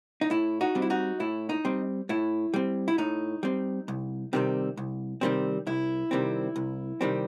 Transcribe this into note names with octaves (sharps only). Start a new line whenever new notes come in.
D#4
A2 E4
D#4 F#4
G3 C4
E4
D#4 F#4
A2 E4
D#4
G3 C4
A2 E4
G3 C4
E4
A2 D#4
G3 C4
C2
C3 D#3 G3 C4
C2
C3 D#3 G3 C4
C2 E4
C3 D#3 G3 C4
C2
C3 D#3 G3 C4